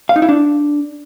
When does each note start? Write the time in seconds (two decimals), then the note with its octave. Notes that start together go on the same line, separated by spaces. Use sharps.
0.09 F5
0.16 D#4
0.22 E4
0.29 D4